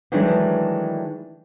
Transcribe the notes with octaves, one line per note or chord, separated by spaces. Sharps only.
D#3 E3 F#3 G#3 A3 D4